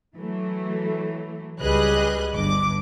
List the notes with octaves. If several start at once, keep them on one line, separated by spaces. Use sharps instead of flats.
E3 F#3 A3
C#2 G3 G#4 B4 D#5 F#6
G1 G2 D6